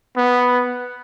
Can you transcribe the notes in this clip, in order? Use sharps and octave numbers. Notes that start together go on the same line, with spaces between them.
B3